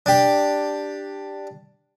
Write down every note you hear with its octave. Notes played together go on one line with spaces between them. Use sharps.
D4 G4